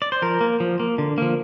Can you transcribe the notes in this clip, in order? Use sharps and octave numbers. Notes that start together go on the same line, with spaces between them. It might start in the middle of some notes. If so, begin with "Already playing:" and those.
D5
C5
F3 A#4
A#3
F3
A#3
D3
F3 A#3